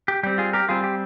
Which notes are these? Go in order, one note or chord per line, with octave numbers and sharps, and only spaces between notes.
G4
G3 C4 G4
F4 G#4
G4 A#4
G3 C4 F4 G#4
G4